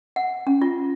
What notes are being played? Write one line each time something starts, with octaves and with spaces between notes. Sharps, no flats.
F#5
C#4
F4